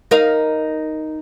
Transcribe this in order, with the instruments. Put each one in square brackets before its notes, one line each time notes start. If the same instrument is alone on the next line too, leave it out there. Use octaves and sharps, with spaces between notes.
[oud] D#4 A#4 F5